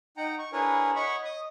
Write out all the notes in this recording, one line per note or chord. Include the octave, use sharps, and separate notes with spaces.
D#4 F#5 G5 A#5
C#6
D4 E4 G#4 A#4 B4 C#5
C#5 D#5 F#5 B5 C#6
D#5 D#6